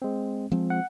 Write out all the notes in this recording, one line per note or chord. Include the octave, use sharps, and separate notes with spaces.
G#3 C4
F3 G#3 C4
F#5